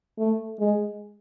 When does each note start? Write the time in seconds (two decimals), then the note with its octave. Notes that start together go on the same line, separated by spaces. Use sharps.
0.18 A3
0.60 G#3